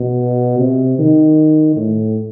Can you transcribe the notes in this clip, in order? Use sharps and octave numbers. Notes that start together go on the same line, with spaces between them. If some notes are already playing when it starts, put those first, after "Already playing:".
Already playing: B2
C3
D#3
A2